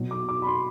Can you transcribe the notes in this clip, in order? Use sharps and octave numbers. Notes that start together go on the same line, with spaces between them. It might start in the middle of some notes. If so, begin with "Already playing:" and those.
Already playing: B2 F#3
D6
D6
B5
C6